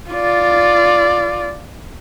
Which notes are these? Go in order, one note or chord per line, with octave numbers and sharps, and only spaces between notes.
F4 D5